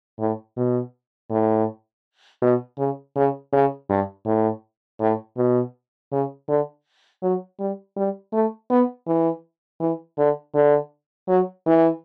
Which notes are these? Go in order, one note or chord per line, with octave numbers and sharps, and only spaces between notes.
A2
B2
A2
B2
C#3
C#3
C#3
G2
A2
A2
B2
C#3
D3
F#3
G3
G3
A3
B3
E3
E3
D3
D3
F#3
E3